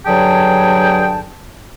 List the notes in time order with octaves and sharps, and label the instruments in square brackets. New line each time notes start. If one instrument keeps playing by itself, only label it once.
[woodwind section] G2 D3 F#3 G#4 G5 A5